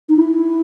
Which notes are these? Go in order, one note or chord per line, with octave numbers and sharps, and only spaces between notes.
D#4
E4